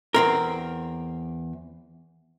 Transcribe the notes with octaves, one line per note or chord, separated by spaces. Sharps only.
E2 C4 A#4